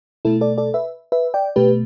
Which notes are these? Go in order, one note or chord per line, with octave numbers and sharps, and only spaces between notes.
B2 A3 E4 A4
A4 D5
A4 D5
B4 E5
B4 E5
D5 G5
B2 A3 G4 B4